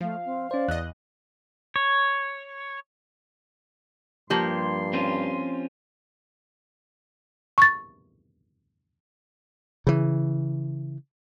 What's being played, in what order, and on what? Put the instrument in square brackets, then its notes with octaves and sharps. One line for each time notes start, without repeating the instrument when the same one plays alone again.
[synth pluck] F3 [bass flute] A3 [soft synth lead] F5
[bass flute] C4
[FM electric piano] C#4 C5 [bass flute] D5
[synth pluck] E2 D#5 [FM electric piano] F#6
[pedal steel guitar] C#5
[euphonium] G2 [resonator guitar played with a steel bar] F3 A#3 G4 [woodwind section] C6
[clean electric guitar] C4 C#4 F4
[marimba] C#6 A6
[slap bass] C#3 E3